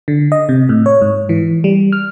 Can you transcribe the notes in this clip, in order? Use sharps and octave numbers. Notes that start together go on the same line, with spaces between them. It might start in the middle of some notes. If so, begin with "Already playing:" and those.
D3
D#5
C3
A2
C#5
G#2
E3
G3
F6